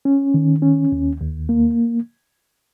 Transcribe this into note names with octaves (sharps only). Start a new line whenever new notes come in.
C#4
D#3
C#4
D#2
D#2
A#3